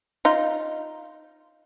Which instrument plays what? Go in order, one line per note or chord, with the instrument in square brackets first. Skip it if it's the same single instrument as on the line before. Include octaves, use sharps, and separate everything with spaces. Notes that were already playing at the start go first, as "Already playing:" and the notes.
[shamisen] D#4 F4